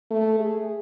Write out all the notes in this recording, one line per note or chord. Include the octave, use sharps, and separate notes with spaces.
A3
G#4